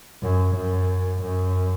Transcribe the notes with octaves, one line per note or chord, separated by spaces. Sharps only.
F#2
F#2
F#2